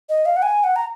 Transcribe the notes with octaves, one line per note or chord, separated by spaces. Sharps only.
D#5
F5
F#5
G#5
F#5
A#5